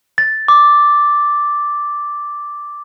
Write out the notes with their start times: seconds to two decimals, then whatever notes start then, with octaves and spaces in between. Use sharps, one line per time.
0.18 A6
0.48 D6